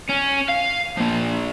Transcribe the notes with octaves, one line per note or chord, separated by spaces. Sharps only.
C#4
F5
F3 A#3